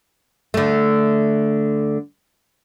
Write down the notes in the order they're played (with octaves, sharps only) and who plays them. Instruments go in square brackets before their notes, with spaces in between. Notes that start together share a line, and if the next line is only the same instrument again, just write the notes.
[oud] D3 A3